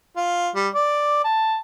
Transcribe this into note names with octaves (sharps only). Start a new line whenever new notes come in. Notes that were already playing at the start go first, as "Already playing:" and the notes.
F4
G3
D5
A5